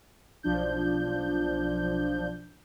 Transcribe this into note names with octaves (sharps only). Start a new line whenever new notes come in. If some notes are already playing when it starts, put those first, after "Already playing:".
B1 F3 D4 G6